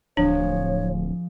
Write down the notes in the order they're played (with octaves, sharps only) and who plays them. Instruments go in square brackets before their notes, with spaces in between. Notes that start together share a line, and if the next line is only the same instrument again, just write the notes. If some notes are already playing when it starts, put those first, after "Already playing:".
[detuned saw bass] D1 [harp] F3 G#3 [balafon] D4 [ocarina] C#5